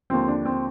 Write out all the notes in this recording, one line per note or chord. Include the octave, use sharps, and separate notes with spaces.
D#2 D3 F3 C4
D4
C4